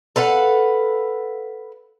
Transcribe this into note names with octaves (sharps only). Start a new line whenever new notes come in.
A4 B4 F5 F#5